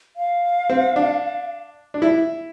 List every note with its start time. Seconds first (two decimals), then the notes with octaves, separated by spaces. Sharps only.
0.16 F5
0.70 C4
0.96 D4
1.94 D4
2.02 E4 E5